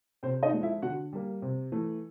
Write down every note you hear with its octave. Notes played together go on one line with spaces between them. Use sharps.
C3 C4 C5
D#4 D#5
F3 G#3
E4 E5
D3 F#4 F#5
G3 A#3
C3
E3 A3